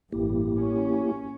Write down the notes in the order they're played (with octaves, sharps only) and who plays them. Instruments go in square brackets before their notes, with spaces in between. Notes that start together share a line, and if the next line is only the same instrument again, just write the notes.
[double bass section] A1 G2 [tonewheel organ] A#3 E4 G4
[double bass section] C#4